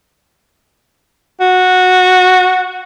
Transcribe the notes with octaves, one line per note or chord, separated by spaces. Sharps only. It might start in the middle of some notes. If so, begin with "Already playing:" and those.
F#4